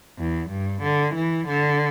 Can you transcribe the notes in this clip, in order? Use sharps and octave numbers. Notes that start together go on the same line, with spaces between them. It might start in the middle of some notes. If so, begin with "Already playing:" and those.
E2
G2
D3
E3
D3